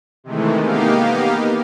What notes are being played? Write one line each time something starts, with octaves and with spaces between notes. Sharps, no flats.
C3 D#3 E3 G#3 A3
A#3 B3 D#4 G4 F5